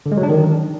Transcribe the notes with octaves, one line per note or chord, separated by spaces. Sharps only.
D3
G#3
F#3
D4
D#3